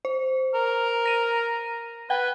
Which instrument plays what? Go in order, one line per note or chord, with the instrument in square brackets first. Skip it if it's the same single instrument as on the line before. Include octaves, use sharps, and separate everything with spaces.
[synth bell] C5
[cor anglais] A#4
[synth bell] A#6 D#7
[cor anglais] B4 [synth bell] F#5 G5